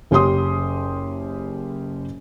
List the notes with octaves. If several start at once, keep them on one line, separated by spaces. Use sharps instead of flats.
F#1 C#4 G4 C6 D#6